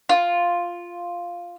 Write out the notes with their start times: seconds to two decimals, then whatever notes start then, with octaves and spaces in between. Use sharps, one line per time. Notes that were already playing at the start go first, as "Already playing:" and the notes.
0.09 F4